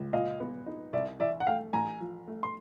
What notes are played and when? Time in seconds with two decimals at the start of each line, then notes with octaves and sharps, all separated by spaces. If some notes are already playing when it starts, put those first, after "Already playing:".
Already playing: C#2
0.13 A#2 D#5 F5
0.40 B3
0.66 D#4
0.93 C2 D5 E5
1.20 E3 D5 E5
1.40 F#5
1.47 A3 F5 G5
1.73 A1 G#5 A#5
2.00 F3
2.27 A3
2.43 C6